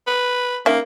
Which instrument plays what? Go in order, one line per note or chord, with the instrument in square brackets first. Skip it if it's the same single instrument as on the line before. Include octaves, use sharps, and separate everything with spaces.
[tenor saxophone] B4
[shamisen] D#3 C#4 E5 [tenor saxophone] A#3